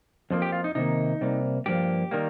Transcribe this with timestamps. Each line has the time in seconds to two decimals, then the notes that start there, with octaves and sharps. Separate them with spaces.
0.30 F2 F3 A#3
0.42 G4
0.52 F4
0.64 D#4
0.75 C3 D#3 A#3 D#4
1.21 C3 G3 A#3
1.66 G2 F3 A#3 G4
2.11 D#3 G3 A#3